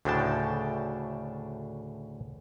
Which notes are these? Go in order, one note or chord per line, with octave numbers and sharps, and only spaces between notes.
D2 A2 C#3 D4 G5 A5